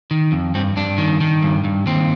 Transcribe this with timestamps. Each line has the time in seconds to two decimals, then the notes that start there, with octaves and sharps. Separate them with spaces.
0.11 D#3
0.32 F2
0.55 G2 C4
0.76 G2 D4
0.98 D#3
1.21 D#3
1.42 G2
1.64 G2
1.86 D#2 C4